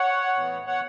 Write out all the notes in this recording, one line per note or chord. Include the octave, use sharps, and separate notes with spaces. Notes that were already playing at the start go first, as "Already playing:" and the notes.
Already playing: C#5 F#5
A2 E3 B3
C#5 F#5